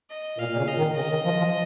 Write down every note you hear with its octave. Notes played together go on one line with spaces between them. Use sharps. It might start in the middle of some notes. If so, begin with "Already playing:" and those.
D#5
A#2 F5
A#2
C#3
D#5
D#3
C#3 D#5
D#3
F3
F3